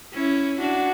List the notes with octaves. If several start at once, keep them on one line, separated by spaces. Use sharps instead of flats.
C#4 E4
D4 F#4